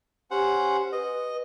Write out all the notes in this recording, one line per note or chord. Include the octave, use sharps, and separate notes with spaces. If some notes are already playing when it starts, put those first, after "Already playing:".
C#4 G4 C5 F#5
B4 D#5